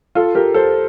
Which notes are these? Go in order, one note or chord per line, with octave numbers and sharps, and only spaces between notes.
F4 A4
G4 A#4
A4 C5